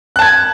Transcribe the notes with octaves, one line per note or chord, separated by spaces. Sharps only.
A5 F#6 G#6